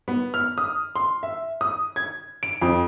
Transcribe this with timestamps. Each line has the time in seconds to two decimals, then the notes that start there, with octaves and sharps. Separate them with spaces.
0.08 B3
0.34 F6
0.58 D#6
0.96 C6
1.23 E5
1.61 D#6
1.96 G#6
2.43 D7
2.62 F2